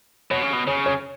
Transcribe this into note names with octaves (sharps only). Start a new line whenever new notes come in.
B2 C#5
C#3
B2
C#3 C#5
C#5